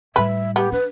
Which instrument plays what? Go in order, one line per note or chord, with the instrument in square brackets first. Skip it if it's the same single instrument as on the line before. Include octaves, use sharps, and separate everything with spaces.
[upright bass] A2 G3 [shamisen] B4 [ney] E5
[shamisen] B3 [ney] G4
[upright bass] D4 [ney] B4